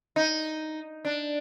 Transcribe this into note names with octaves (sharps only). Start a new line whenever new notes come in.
D#4
D4